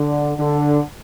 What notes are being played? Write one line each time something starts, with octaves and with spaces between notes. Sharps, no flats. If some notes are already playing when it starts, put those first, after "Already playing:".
Already playing: D3
D3